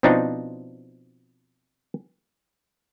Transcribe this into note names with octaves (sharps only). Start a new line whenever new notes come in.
B2 F3 C4 D4 D#4